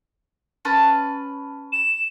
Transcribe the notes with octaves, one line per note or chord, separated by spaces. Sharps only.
C#4 B4 A5
E7